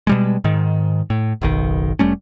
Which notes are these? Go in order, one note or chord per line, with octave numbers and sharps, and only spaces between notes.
B2 G3 G#3
G#2 D#3
A2
F#1 B1 D#3
F1 G3 A3 C#4